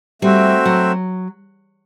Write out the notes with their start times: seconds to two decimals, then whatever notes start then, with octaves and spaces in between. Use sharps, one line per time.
0.22 G3 A3 C4 F#4 C5 E5
0.66 F#3